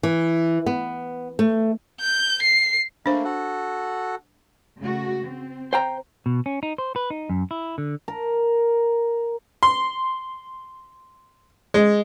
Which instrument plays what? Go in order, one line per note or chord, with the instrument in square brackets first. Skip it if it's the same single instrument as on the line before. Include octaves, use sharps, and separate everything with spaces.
[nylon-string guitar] E3
B3
A3
[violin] G6
C7
[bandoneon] A3 A#3 [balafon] D4 C5
[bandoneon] F#4 A4 F#5
[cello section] C#3 A3 F#4
C4
[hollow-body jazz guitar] C5 G5 A#5
[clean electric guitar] B2
C#4
D#4
C5
B4
D#4
F#2
E4
D3
[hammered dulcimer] A#4
[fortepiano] C6
G#3